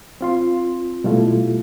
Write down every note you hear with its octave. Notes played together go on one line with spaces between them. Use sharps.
C4 F4 C6
B2 G3 A3 E4 F4 A4